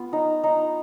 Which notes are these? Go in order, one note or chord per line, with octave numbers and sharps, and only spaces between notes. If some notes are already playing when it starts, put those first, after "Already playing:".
Already playing: B3 F4
D#4
D#4